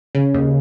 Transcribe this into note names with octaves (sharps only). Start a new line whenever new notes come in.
C#3
D#2